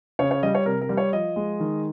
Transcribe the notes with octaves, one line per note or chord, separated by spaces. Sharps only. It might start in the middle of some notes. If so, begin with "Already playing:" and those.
C#3 C#5
C#5
G3 D#5
C#5
C3 A#4
A#4
G3
C#5
F3 D#5
G#3
D#3